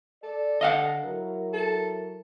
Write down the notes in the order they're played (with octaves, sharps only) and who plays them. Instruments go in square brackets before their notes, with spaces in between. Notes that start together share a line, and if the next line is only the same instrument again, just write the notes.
[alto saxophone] A4 [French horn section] D5
[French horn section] D3 [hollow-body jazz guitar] D#5 F5 F#5
[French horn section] F#3 E4 A#4
[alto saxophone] A4